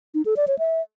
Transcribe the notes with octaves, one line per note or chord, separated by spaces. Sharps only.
D#4
A4
D5
C#5
E5